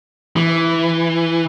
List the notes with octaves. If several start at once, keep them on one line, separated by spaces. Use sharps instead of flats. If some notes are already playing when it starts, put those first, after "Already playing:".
E3